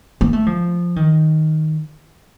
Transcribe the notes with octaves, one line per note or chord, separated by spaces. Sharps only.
A#3
A3
F3
D#3